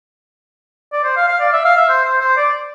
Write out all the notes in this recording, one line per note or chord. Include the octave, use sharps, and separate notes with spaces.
D5
C5
F5
F5
D5
E5
F5
E5
C5
C5
C5
D5